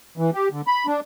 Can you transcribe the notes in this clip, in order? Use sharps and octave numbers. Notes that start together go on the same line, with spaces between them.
E3
G4
D3
B5
D4